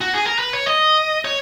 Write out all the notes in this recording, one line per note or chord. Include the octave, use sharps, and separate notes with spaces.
F#4
G#4
A#4
B4
C#5
D#5
C#5